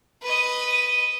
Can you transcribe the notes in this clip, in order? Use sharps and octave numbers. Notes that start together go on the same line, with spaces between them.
B4 D#5